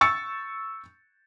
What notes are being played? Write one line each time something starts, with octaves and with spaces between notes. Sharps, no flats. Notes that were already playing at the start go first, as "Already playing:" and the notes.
C#6 E6 A6 C#7